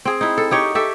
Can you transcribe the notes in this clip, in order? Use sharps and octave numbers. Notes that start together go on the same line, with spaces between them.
C4 G#4
D#4 E4
A4
D#4 G4 C#5
G4 A4 E5